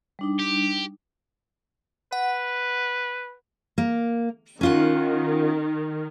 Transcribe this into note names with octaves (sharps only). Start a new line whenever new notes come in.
G3 D4 D#4
G4
B4 F#5
A#3
D#3 C#4 F4 F#5